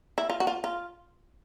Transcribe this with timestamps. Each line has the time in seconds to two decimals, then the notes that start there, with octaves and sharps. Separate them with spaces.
0.18 E4
0.30 F4
0.40 F#4
0.47 F4
0.64 F4